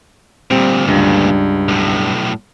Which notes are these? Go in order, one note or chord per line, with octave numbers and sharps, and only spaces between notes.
D2 A#2 G3 C4
C#2 G2
B1 A2